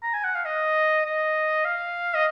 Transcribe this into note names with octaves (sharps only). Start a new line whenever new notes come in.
A#5
G#5
F#5
F5
D#5
D#5
F5
D#5